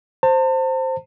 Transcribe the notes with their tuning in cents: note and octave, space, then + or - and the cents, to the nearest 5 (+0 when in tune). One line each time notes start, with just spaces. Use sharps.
C5 +0 A5 +40